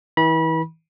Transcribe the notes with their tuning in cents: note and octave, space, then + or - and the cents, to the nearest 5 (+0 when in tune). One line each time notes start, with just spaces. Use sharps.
E3 -35 B5 -30